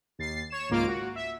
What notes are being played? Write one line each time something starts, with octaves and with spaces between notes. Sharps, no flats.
D#2 A6 C7
C#5 E7
G#1 C#2 A#3 F4 F5 D7
F#4
E5